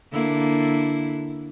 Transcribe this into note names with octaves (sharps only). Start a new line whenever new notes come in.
D3 A#3 E4